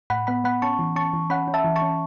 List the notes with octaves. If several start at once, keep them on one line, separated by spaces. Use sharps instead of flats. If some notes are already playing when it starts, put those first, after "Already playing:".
A2 F#5 B5
B3 F#5 B5
B3 F#5 B5
C#4 A5 C#6
E3
C#4 A5 C#6
E3
C#4 F#5 B5
C#4
E5 A5
E3
A5 C#6
C#4